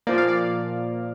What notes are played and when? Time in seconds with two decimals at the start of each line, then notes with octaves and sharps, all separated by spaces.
0.07 A#2 F3 A#3 D5
0.18 F5
0.28 D5